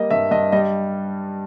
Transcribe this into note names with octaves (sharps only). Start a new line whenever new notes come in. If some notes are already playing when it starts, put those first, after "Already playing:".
Already playing: G3 A#3 D#5
G2 E5
G2 D#5
G3 D#5